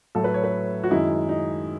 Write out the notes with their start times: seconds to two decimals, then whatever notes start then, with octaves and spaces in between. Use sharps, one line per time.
0.15 A2 F#3 A3 A4
0.24 B4
0.34 C#5
0.44 B4
0.84 F#4
0.91 F#2 D#3 G#3 E4
1.29 D#4